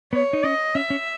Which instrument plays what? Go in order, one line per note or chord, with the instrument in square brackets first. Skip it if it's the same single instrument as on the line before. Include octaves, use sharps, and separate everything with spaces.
[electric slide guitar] B3 [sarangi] C#5
[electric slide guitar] D#4
[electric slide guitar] C#4 [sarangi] D#5
[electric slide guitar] C#4 [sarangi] E5
[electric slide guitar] C#4